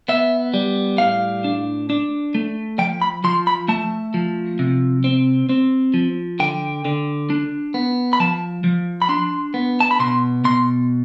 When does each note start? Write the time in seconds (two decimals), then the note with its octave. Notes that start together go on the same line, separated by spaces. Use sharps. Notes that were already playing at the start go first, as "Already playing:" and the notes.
0.08 B3 E5
0.54 G3
0.98 A2 F5
1.44 D4
1.90 D4
2.35 A3
2.78 F3 G5
3.02 B5
3.24 F3 C6
3.47 B5
3.68 A3 A5
4.14 F3
4.59 C3
5.04 C4
5.49 C4
5.94 F3
6.40 D3 G5
6.85 D3
7.30 D4
7.74 B3
8.13 B5
8.20 F3 A5
8.64 F3
9.02 B5
9.09 D4 C6
9.54 B3
9.80 A5
9.91 B5
9.99 B2 C6
10.44 B2 C6